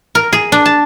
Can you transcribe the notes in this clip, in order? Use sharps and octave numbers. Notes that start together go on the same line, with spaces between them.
A#4
G#4
D4
A5